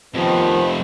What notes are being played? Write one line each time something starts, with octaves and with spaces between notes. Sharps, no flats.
F2 C3 D#3 F3 B3